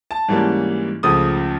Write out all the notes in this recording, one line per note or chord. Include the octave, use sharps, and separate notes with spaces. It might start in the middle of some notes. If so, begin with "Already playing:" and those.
A5
G#2 E3 G3 A#3 C#4
C#2 C#3 F3 A3 D#6